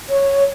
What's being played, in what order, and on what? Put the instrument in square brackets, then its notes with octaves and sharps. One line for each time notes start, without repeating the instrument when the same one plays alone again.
[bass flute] C#5